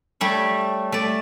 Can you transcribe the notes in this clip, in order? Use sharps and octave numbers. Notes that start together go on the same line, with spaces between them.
G3 A3 C#5
A3 D5